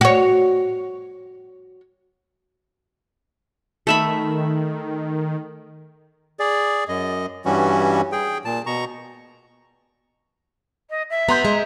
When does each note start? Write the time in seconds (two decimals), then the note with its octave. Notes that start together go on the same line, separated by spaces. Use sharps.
0.01 F#4 C#5
3.87 D#3 A3 E5 B5
6.39 G#4 D5
6.88 F#2 D#5
7.45 G2 E3 G3 C#4 F#4
8.12 G#4 G5
8.45 A#2 A5
8.66 B2 A#5 C#6
10.90 D#5
11.10 E5
11.29 B3 A#5 C6 G6
11.45 G#3